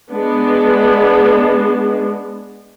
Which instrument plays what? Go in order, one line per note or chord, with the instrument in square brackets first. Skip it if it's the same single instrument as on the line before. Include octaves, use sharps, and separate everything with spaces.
[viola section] G#3 B3 D4